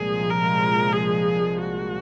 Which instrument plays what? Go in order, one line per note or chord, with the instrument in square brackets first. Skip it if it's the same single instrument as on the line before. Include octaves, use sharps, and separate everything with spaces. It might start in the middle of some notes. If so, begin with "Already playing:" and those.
Already playing: [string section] C2 A#2 F3 G#3 [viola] G#4
[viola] A#4
G#4
F#4